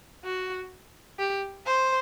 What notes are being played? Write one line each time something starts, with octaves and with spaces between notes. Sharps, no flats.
F#4
G4
C5